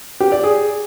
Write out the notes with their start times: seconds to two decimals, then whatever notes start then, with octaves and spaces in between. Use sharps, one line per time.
0.20 G4
0.32 D5
0.44 G#4